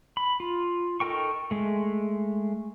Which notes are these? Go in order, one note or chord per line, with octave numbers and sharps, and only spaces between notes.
B5
F4
D#4 A4 A#4 G5 C#6
G#3 A3